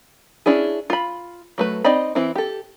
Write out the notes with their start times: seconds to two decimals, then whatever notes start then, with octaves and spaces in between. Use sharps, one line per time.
0.46 C#4 D4 E4 G#4
0.90 F4 B5
1.58 F#3 A3 B4
1.85 C4 D#4 D5 D#5 B5
2.15 E3 C4 E4
2.35 G4 A4